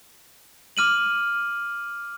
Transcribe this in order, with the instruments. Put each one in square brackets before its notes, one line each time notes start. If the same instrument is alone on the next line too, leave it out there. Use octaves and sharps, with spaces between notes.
[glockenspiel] D6 F6 D#7 F#7